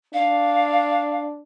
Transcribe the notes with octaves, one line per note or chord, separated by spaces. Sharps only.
D4 F5